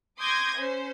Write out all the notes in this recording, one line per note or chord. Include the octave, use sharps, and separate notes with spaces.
C6 D6 D#6 G6 G#6 A#6
C#4 C5